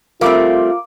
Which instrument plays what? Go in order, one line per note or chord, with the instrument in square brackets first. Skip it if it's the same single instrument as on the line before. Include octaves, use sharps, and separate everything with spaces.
[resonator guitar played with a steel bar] G3 A3 C4 [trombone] F4 [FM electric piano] A#4 F5 D6